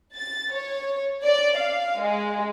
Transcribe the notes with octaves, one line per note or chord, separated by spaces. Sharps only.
A6
C#5
D5
F5
G#3